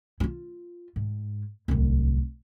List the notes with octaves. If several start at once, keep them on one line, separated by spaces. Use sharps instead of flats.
E4 F4
G#2
D1 C2